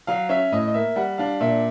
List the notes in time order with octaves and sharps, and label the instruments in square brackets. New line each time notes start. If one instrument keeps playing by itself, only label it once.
[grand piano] F#3 F5
C#4 E5
A2 D#5
D#5
A#3 E5
G3 F#5
D4 F5
A#2 E5